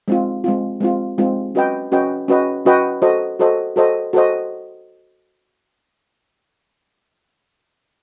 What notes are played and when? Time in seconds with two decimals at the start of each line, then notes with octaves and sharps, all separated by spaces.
0.08 G#3 C4 F4
0.44 G#3 C4 F4
0.80 G#3 C4 F4
1.18 G#3 C4 F4
1.55 C#4 F#4 B4 D#5 G5
1.92 C#4 F#4 B4 D#5 G5
2.28 C#4 F#4 B4 D#5 G5
2.66 C#4 F#4 B4 D#5 G5
3.02 F#4 A4 C5 D#5
3.40 F#4 A4 C5 D#5
3.76 F#4 A4 C5 D#5
4.13 F#4 A4 C5 D#5